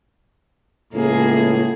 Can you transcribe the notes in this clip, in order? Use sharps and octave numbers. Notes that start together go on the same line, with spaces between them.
C#2 A2 A#3 G#4